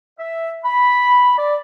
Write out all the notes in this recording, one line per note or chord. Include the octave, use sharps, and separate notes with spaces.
E5
B5
D5